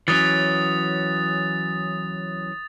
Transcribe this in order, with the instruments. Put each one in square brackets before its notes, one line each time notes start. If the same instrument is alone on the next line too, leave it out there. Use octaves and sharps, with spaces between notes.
[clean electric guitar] E3 F#3 C#4 [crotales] D#6 A6